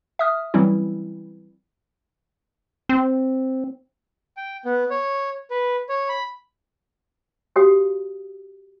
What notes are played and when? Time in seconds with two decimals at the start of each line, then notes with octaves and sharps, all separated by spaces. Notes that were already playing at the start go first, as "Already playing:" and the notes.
0.19 E5 D#6 F6
0.54 E3 F#3 G3 C4 C#4 E4
2.89 C4
4.37 G5
4.65 B3
4.90 C#5
5.50 B4
5.89 C#5
6.09 B5
7.56 F#4 G4 C#5 F5 G5 D#6